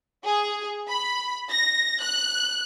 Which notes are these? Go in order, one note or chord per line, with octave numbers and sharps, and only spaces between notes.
G#4
B5
A#6
F#6